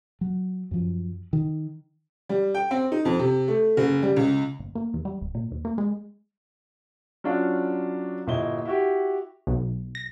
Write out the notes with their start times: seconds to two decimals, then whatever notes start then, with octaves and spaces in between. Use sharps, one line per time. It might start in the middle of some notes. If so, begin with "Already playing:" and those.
0.21 F#3
0.71 F#2 F3
1.33 D#3
2.29 G3
2.54 G5
2.71 C4
2.92 D#4
3.05 F2
3.19 C3
3.48 A3
3.77 F#1
4.03 G3
4.16 C#2
4.59 G1
4.75 A#3
4.94 E2
5.05 G3
5.21 D1
5.35 A#2
5.51 D#2
5.65 A#3
5.78 G#3
7.24 F#3 C#4 D4 F4
8.27 G1 A#2 E4 D#5 G7
8.65 E4 F#4 G4
9.47 B1
9.95 A#6